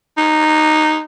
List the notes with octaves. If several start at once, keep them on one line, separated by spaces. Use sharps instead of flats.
D#4